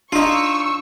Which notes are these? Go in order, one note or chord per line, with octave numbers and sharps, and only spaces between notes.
D4 D#4 F4 C#6 E6